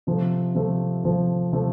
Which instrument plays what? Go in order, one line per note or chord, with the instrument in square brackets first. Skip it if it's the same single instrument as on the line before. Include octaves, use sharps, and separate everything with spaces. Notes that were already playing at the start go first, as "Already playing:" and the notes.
[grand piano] C3 F3 A3
C3 F3 A3
C3 F3 A3
C3 F3 A3